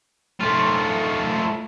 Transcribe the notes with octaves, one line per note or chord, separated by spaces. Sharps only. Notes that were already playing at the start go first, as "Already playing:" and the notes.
A3 F4